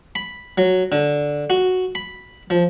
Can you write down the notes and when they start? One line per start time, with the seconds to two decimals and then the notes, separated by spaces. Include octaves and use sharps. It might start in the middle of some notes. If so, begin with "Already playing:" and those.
0.15 B5
0.58 F#3
0.92 D3
1.50 F#4
1.95 B5
2.50 F3